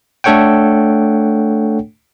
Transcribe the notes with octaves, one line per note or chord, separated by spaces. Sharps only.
A3 D4 A4 C#5 F#5 G5